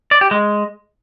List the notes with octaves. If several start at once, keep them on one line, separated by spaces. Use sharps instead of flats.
D5
G4
G#3